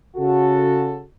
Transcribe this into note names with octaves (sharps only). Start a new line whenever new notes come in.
C#3 F#4 A4